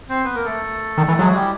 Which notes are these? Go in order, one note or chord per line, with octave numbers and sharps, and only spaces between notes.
C4 C5
B3 B4
A#3 A#4
A3 A4
D#3
E3
F#3 G#3 G#4
F#4
G3 G4
E4